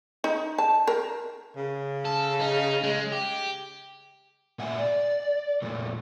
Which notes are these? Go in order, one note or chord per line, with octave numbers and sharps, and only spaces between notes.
D#4
A5
A#4
C#3
A4
D#4
G#3
G4
A#2 A3 E5 F#5 G#5
D5
F2 A#2 A3